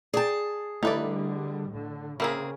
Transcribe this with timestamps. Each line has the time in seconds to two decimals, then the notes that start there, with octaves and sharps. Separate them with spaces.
0.14 G#4 D5 G5 A5
0.83 D3 G3 A3 D#4 E4 B4 D5
1.69 A2 D3
2.20 C#3 A#3 C4 G#4 A#4 E5 B5